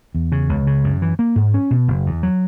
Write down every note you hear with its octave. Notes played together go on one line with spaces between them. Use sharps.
E2
C#3
C#2
C#3
F#2
E3
A#3
G#2
C#4
B2
F#1
E2
F#3